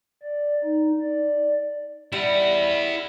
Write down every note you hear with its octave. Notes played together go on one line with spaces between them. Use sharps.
D5
D#4
D5
G3 E4 F#5